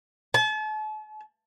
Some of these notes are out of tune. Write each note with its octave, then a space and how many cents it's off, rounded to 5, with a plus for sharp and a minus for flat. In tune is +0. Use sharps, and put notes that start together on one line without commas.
A5 -40